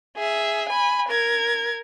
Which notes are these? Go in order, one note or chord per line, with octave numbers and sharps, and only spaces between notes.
G#4 E5
G#5 B5
A#4 G#6